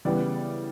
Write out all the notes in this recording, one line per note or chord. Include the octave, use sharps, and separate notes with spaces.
C#3 E3 G3 B3 D5